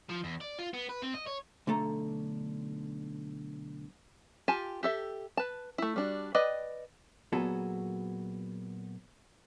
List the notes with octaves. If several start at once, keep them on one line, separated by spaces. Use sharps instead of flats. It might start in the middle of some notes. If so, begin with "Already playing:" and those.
F3
E2
D5
F4
B3
B4
C4
D#5
C#5
B1 D3 A3 A4 A#5
F4 G4 G#5 A5
G4 A4 E5
B4 A5
A3 E4
G3 D4 F#4
B4 D5 D#5 G5
A#2 F#3 B3 F#4 G#4 A4